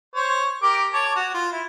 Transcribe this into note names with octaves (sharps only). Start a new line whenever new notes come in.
C5 C#5
G4 A#4 D6
C#5 A5 D6
F#4
F4
E4